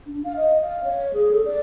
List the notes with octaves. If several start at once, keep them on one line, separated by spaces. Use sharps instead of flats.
D4
F5
D#5
F5
C#5
G#4
A4
D5